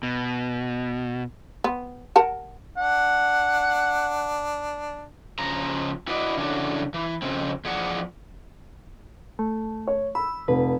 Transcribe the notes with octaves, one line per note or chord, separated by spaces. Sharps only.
B2
B3
A#4 F#5 A5
D4 F#5
C#3 F3 A#5
E4 F#4 B4 D5 D#5
C#3 E3 F#3 D4 F#4 A4
E3
F2 A#2 C#3 C4
E2 F3 G#4 D5 F#5
A3
C#5
B5 E6
F1 B4